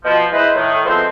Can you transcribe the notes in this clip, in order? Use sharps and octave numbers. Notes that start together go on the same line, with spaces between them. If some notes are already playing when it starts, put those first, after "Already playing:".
B2 F3
G#3 E4 B4 C5
A2 D#3
F3 G#3 A3 B3 C4